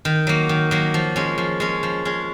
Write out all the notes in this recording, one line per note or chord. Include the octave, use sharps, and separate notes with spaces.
D#3
F#3 A#3
D#3
F#3 A#3
F3
G#3 C#4
F3
G#3 C#4
F3
G#3 C#4